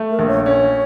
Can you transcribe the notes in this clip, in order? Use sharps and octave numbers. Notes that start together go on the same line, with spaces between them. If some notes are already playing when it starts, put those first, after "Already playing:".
Already playing: A3
A#4
A#1
C#5
C#4 C#5